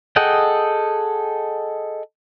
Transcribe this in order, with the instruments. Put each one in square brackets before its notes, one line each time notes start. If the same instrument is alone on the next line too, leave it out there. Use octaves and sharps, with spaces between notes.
[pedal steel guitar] G#4 A4 D#5 F#5 G5